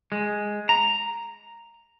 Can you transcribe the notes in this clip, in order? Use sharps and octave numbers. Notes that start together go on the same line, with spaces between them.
G#3
A#5